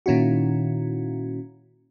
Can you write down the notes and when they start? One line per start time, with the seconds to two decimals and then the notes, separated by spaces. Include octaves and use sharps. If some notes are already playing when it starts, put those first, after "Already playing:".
0.06 A#2 D#3 C#4 E4 F#4